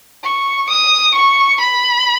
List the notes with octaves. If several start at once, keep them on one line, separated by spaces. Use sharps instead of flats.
C#6
D#6
C#6
B5